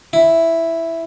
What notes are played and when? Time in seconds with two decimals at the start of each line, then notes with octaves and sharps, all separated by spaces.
0.13 E4